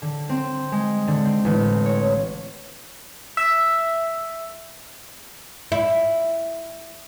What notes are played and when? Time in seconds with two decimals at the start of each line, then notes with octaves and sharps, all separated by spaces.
0.02 D3
0.29 C4
0.72 G#3
1.08 D3
1.25 C4
1.45 A1
1.86 C#5
3.37 E5
5.72 E4